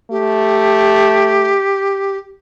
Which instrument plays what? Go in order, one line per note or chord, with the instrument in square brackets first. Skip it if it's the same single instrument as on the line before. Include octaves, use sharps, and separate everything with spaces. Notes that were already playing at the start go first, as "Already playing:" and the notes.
[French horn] A3 [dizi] G4